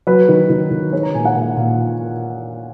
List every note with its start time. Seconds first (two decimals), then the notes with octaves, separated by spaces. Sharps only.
0.07 F#3 B4
0.29 D#3
0.50 D#3
0.71 D#3
0.93 G#3 C#5
1.03 A#5
1.14 A#2 G#5
1.25 F#5
1.35 A#2
1.57 A#2